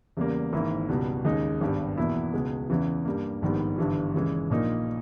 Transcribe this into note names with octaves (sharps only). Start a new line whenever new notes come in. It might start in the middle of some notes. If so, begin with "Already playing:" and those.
E2 C#3 G3 A#3
G#1 G#2 E3 A#3 E4
C#2 B2 G3
D#2 C#3 G#3 D#4
G#1 G2 G3 B3
E2 B2 A#3 E4
C#2 B2 G#3
E2 C#3 E3
G2 G3 A#3
A#1 G#2 D#3 G3 B3
G1 G2 E3
D#2 C#3 E3 G#3
A#1 A#2 A#3 D#4